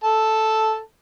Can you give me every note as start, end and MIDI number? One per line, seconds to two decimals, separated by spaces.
0.04 0.79 69
0.04 0.79 81